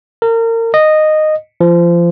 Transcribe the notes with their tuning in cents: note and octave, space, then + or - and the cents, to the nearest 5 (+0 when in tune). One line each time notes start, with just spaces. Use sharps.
A#4 -30
D#5 -10
F3 -25